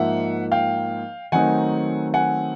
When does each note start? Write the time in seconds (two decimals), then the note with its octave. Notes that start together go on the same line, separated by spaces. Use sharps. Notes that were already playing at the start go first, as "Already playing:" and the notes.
Already playing: G#2 F3 A#3 D#4 E5 F#5
0.52 F5 G5
1.32 D#3 F#3 A3 C4 D#4 F#5 G#5
2.14 F#5 G#5